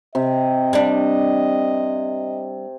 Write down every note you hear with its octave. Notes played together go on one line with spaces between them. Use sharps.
C3 D#5
G3 D4